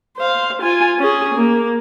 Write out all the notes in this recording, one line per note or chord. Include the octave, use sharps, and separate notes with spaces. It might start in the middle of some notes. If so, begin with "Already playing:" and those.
C5 F5
F4 G#5
C#4 G#4
A#3